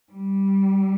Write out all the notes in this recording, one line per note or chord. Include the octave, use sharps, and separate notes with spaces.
G3